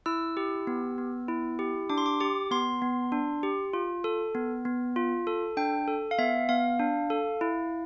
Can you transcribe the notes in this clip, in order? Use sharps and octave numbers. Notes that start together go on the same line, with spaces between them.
E4 E6
G4
B3
B3
E4
G4
D4 D6
C6
D6
G4 D6
B3 C6
B3
D4
G4
F4
A4
B3
B3
F4
A4
D4 G5
A4
F5
B3 E5
B3 F5
D4
A4
E4